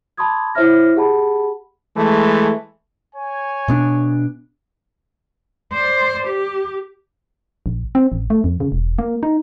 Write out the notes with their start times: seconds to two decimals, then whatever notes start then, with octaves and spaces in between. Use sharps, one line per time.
0.17 A5 B5 C6 D6 D#6 G#6
0.55 E4 C5 C#5 E5 F6 A#6
0.95 G4 G#4 F#5 A5 B5
1.96 E3 G#3 A3
3.15 C#5 G#5
3.68 B2 B3 D4
5.73 C5 D5
6.27 G4
7.66 A#1
7.95 C4
8.12 A1
8.30 A3
8.44 F2
8.60 C#3
8.72 E1
8.99 A#3
9.23 D#4